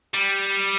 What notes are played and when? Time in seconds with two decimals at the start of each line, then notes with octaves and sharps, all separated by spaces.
0.14 G3